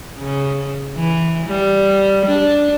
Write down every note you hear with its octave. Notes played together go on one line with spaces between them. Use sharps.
C#3
E3
G3
D4